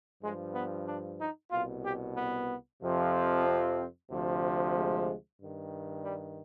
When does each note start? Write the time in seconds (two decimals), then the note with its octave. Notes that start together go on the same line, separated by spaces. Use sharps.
0.22 G2 F3 G#3
0.54 B3
0.87 D4
1.19 D#4
1.51 C2 B2 F4
1.83 G4
2.15 B3
2.81 F2 C3 F3
3.45 C4
4.09 D2 C3 F3
4.75 G#3
5.39 G2 D#3
6.04 G3